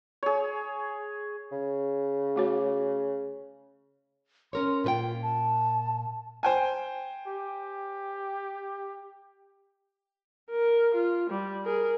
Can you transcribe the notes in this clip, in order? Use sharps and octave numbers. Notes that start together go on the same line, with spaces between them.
G#4 C#5
C#3
A3 F#4 C#5
C#4 A#4 C#5 C6
A#2 F4 B4 G5
A5
C5 G5 G#5
G4
A#4
F4
G3
G#4 A#4